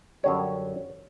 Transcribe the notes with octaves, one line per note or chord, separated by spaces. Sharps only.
F#2 D3 G3 C#5